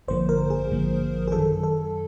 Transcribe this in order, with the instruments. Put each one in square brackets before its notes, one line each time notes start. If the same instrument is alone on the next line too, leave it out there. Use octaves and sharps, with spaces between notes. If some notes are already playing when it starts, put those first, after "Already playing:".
[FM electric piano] A1 G2 D3 F3 A#3 C5
A#4
G#4
A1 G2 D3 F3 A#3
G#4
F#2 D#3 F#3 A4
A4